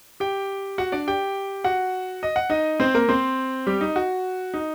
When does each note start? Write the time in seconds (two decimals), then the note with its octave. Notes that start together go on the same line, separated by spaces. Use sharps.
0.20 G4 G5
0.78 F#4 F#5
0.92 D4 D5
1.07 G4 G5
1.64 F#4 F#5
2.23 D#5
2.36 F#5
2.50 D#4 D#5
2.80 C4 C5
2.94 A#3 A#4
3.09 C4 C5
3.67 G3 G4
3.81 D#4
3.96 F#4
4.54 D#4